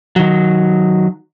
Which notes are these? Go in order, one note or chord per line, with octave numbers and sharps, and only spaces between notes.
D#3 F#3